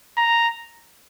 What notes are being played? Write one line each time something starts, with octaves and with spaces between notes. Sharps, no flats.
A#5